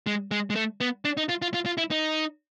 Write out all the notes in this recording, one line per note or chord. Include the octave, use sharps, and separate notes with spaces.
G#3
G#3
G#3
A3
B3
D4
D#4
F4
F4
F4
F4
E4
D#4